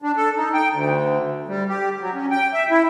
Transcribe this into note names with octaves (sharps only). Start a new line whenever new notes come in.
D4
A4
D#4
G5
D2
G3
G4
F#3
C#4
G5
E5
E4